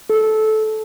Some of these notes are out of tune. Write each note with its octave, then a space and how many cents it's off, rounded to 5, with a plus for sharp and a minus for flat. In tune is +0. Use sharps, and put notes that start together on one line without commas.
A4 -15